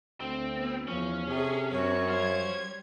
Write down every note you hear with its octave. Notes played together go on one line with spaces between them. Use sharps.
D2 C4
B3
E2 F3 C#4
C3 G#4 A4 G#5
F#2 C4 F#4 C#5
G3 C5 F5 G#6